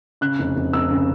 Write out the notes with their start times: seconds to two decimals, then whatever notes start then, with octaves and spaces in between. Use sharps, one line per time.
0.21 C#3 F#6
0.39 F1
0.57 F1
0.73 F1 E6
0.91 C#3